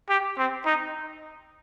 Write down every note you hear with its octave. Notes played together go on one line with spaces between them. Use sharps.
G4
C4
D#4